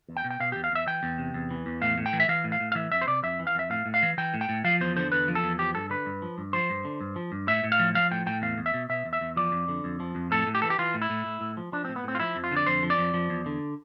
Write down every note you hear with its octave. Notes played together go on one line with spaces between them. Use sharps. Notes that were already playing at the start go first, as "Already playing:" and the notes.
E2
G5
B2
G5
B2 F5
G4
E2
F5
E2 E5
E3 G5
E2
C3
E2
E3
E2
A2 F5
A2
G5
E3
E5
E3 F5
A2
F5
A2
F5
E3 E5
F2 E5
C5
C3 D5
F2 E5
E3
F5
F2 E5
A2 F5
A2
F5
E3
E3 G5
A2
G5
A2
F3 F5
E2 C5
D3 C5
E2 B4
F3
A4
E2
F3 G4
G2 A4
D3 B4
G2
F3
G2
F3 C5
G2
D3
G2
F3
G2
A2 E5
A2
F5
F3
F3 F5
A2 G5
A2 G5
E2 F5
E2
E5
B2
B2 E5
E2
E5
E2
F3 D5
F2
D3
F2
F3
F2
A2 A4
A2
G4
E3 A4
G4
E3 F4
A2
E4
A2
A2
A2
F3
F3 D4
C4
A2
B3
A2 C4
F4
F3 E4
F2
F4
D3
D5
F2 C5
F3
D5
F2
F3
E2
D3